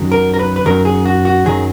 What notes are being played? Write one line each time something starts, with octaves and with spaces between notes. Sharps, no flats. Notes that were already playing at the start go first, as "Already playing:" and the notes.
Already playing: F#2 D#3 F#3
A#4
A#4
B4
B4
F#2 D#3 F#3 A#4
G#4
F#4
F#4
F#2 D#3 F#3 G#4